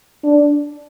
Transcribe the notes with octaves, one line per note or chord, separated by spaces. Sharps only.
D4